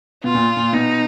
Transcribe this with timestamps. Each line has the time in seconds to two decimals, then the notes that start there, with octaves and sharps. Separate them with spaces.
0.24 B2 F4
0.35 A#2
0.57 A#2
0.73 B2 D#4